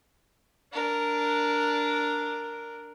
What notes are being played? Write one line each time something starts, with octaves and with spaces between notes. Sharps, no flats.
D4 A#4